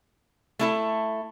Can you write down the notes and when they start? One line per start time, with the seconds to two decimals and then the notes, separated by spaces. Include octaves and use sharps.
0.59 A3 E4 A4